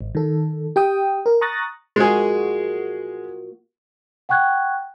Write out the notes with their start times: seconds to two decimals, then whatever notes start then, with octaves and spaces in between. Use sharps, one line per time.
0.01 G#1
0.15 D#3 A4
0.76 G4 G5 D#6
1.26 A#4
1.41 A#5 C#6 D#6 F#6 A6 A#6
1.96 G#3 A#3 F4 F#4 G#4
4.29 F#5 G5 C#6 F#6 G#6